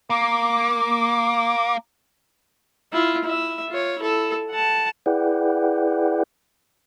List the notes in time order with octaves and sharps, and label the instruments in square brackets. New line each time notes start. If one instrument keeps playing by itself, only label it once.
[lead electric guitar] A#3 [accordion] D6
[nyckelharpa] E4 F4
E4 E5
F4 C#5
E4 A4
F#5 A5
[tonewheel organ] E4 G#4 B4 D5 F#5 G5